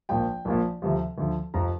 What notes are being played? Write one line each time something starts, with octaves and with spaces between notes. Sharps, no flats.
A#1 A#2 F3 G5
A#1 A#2 F3
D2 C3 F3
D2 D3 F3
F1 F2 F3 A#5